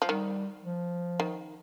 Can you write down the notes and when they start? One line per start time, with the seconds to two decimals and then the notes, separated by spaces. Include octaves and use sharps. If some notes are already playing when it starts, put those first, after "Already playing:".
0.02 F3
0.08 D#3 G3
0.64 F3
1.20 D#3